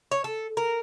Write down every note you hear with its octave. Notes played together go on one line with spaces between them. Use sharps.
C#5
A4
A#4